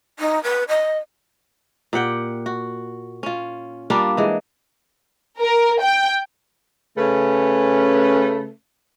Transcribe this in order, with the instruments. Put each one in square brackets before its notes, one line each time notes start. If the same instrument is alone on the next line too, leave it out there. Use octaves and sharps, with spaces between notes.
[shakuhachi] D#4
B4
D#5
[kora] A#2 G4 F#5 G5
F#4
C#4 F4
G3 A#3 D4 F4
E3 G#3
[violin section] A#4
G5
[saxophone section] C#3 A3 C#4 B4